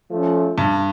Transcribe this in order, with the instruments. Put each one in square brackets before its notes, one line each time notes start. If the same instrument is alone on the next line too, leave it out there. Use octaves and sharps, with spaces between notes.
[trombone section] F3 A3 C#4
[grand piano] G2